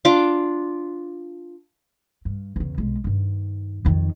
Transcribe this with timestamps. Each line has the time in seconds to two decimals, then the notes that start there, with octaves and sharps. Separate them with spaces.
0.05 D4 F4 D6
2.25 G2
2.56 E2 C#3
2.78 B1 G#3
3.04 G2 D#3
3.85 F2 D#3